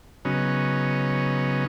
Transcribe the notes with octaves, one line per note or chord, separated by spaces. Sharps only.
C#3 F#3 B3 C#4 D#4